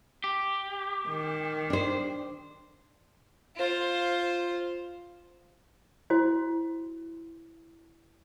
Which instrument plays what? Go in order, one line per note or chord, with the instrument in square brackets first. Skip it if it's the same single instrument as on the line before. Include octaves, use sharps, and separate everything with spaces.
[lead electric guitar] G4
[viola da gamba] D#3
[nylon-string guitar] D4 C5
[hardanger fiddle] F4 C5
[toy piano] E4 F#4 C5